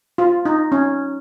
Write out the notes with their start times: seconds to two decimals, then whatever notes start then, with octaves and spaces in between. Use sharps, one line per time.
0.18 F4
0.45 D#4
0.72 C#4